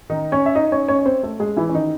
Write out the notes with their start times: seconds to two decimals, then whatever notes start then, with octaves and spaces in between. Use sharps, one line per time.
0.10 D#3 D#4
0.32 C#4 C#5
0.46 E5
0.55 D#4 D#5
0.72 C#4 C#5
0.88 C#4 C#5
0.99 C#5
1.06 C4 C5
1.23 A3 A4
1.40 G#3 G#4
1.57 E3 E4
1.69 C#4
1.74 D#3 D#4